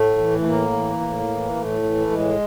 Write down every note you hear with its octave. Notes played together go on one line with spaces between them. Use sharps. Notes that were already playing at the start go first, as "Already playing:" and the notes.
Already playing: A2 A3
E3
A3
A2 A#3
E3
A2
E3
A2 A3
E3
A2 G#3